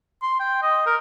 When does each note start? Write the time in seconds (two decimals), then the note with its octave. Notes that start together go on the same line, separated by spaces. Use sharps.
0.22 C6
0.40 G5
0.62 D#5
0.86 A#4